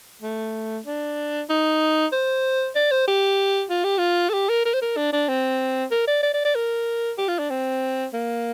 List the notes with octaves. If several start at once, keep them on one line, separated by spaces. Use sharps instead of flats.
A3
D4
D#4
C5
D5
C5
G4
F4
G4
F4
A4
G4
A#4
A#4
C5
A#4
D4
D4
C4
A#4
D5
D5
D5
D5
A#4
G4
F4
D4
C4
A#3